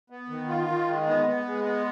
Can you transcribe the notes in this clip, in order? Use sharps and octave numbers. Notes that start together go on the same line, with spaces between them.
B3
D#3
F4
D#3
G#3
B3
B3
G#3
B3